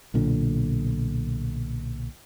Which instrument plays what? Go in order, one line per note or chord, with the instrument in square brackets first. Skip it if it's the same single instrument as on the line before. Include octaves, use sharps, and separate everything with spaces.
[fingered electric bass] B1 A#2 D3